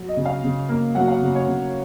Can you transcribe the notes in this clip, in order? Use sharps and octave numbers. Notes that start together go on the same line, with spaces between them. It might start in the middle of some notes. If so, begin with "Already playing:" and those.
Already playing: F#3
D#5
C#3
F5
C#3
A#3
F#3 F#5
F5
C#3
C#5
C#3